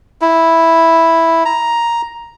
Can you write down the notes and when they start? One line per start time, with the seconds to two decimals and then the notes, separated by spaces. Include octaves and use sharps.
0.21 E4
1.45 A#5